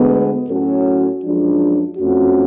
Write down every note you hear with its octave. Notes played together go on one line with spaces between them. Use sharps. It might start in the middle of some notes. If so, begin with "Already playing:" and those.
Already playing: D2 D3 G#3 B3
A2 F#3 C#4 F#4 A4
F#2 F3 G#3 D4
F2 F3 A3 C#4 F#4